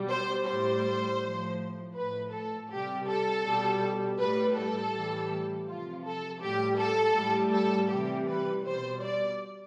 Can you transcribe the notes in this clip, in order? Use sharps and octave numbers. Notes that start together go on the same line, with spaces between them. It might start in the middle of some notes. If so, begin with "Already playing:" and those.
Already playing: B2 G3
C5
A2 G3 C5
A2 F3
A2 F3 B4
A4
C3 G3 G4
A4
B2 G3
A2 G3 B4
A4
A2 E3 G3
C3 F3 F4
A4
A2 G3 G4
A4
A2 G3
A4
C3 E3 G3 G4
B4
B2 G3 C5
D5